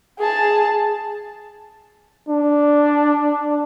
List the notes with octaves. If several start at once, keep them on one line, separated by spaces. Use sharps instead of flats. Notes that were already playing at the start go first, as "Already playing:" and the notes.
G#4 A5
D4